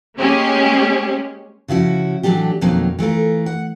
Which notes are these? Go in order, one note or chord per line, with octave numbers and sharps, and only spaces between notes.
G#3 A#3 C#4 G4 G#4
C#3 F3 E4 F#4
A2 E3 F#3 D4 G4
F2 B2 D#3 F#3 A#3 C4
E3 A3 F4 A#4
F#5